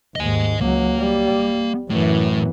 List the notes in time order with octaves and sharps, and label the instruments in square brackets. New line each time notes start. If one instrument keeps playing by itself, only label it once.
[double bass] D#2 G#2 [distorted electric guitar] D#5 G#5
[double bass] C#2 F#3 [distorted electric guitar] A#3
[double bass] G3
[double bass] F#2 E3 [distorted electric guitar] A2